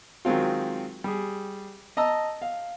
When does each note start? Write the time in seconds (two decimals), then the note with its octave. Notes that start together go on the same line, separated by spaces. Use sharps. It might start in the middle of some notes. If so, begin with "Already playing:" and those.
0.25 D#3 F#3 G#3 C4 F4
1.04 G3 G#4
1.97 D#5 A5 A#5 E6
2.42 F5